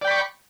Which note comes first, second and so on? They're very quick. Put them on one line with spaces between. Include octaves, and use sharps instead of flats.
D5 G5 B5 C#6